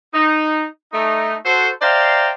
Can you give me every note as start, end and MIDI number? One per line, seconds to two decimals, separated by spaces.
0.14 0.64 63
0.93 1.35 57
0.93 1.35 63
1.45 1.70 66
1.45 1.70 69
1.45 1.70 72
1.81 2.30 72
1.81 2.30 74
1.81 2.30 76
1.81 2.30 77
1.81 2.30 79
1.81 2.30 82